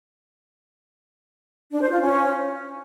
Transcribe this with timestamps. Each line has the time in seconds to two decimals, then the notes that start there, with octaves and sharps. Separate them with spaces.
1.71 D4
1.81 C5
1.90 F4
2.00 C#4